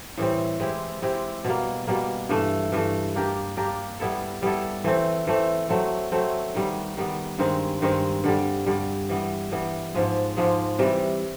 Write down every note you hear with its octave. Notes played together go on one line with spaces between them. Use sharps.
A2 E3 G3 C4
G#3 C4 E4 G4
G#3 C4 E4 G4
B2 G3 A#3
B2 G3 A#3
G2 E3 A3
G2 E3 A3
A#3 D4 G4 A#4
A#3 D4 G4 A#4
G3 B3 E4 A4
G3 B3 E4 A4
E3 A3 C4
E3 A3 C4
F#3 A3 C4
F#3 A3 C4
D#3 G3 B3
D#3 G3 B3
G2 D#3 G#3 C4
G2 D#3 G#3 C4
G2 D3 G3
G2 D3 G3
E3 G3 B3
E3 G3 B3
G#2 F3 G#3
G#2 F3 G#3
C3 E3 G3